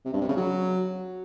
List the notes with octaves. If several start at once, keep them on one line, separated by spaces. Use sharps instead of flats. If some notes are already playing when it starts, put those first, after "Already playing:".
C3
G2
C3
C#3
F#3